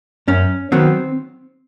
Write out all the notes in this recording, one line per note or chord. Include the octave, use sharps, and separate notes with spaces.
F#2 C#4
D#3 F#3 B3 C4